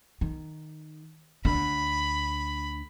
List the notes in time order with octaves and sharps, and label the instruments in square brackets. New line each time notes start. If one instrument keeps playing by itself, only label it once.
[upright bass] D#3
[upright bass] D2 D3 [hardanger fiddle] B5